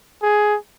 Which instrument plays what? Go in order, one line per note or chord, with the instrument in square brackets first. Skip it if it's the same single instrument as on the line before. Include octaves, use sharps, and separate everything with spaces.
[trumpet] G#4